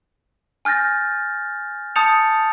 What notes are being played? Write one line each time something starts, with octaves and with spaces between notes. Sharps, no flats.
G#5 F6 G6 A6 A#6
A5 D#6 G6 A6 C#7 F7